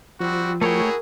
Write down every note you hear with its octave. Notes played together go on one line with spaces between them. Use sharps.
F3 G3 C4 F#4
A3 E4 F#4 G#4 A#4 C#5 G5